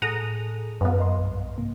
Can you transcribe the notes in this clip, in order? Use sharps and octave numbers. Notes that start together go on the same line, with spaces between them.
A2 G#4 A4 F#5 A#5 D#6
F#2 B3 B4 F5
A#4 D#5 C6
B1 G2
G#2 C3 A#3